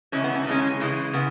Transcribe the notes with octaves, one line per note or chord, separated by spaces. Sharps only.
C#3 E3 G#3 C#4
B3
C#4
D#4
C#3 E3 G#3 C#4
C#3 E3 G#3
C#3 B3